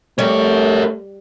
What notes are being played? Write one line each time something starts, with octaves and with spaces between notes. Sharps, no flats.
G3 A3 A#4 C#5